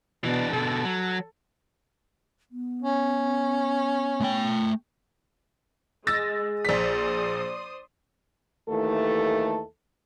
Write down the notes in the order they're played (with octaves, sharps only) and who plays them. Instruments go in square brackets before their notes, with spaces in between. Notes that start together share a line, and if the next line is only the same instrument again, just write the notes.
[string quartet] B2 [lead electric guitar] E3 D4
[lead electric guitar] B2 D3 [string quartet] A4
[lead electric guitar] F#3
[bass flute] B3
[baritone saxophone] C#4
[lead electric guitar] A3 G5
[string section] G#3 [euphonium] G#4 [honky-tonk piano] E6 A6 A#6
[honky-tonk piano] A#1 B6 [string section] C5 D5 D#6
[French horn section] D#2 E3 A3 A4